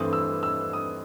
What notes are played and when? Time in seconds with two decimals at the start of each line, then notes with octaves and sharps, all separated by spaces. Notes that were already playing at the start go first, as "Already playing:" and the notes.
Already playing: G2 E3 A3 C4 D#6
0.13 E6
0.43 E6
0.73 D#6